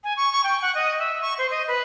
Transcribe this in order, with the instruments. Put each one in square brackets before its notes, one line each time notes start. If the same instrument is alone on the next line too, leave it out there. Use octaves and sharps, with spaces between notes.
[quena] G#5
C#6
C#6
G5
F#5
D#5
E5
C#6
C5
D#5
B4